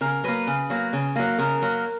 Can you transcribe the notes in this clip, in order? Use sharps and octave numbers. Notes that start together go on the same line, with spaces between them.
C#3 A#4
F#3 A#3 B4
C#3
F#3 A#3
C#3
F#3 A#3
C#3 A#4
F#3 A#3